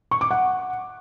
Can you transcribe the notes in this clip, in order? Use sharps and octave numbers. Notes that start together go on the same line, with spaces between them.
C#6
D6
F#5